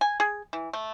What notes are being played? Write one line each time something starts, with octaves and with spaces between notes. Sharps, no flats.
G#5
G#4
E3
A3